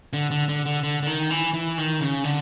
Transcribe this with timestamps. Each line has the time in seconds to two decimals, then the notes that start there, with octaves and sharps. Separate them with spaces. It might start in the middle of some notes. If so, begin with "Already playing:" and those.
0.13 D3
0.31 D3
0.48 D3
0.65 D3
0.83 D3
1.03 D3
1.07 D#3
1.30 E3
1.54 E3
1.78 D#3
2.00 C#3
2.24 D3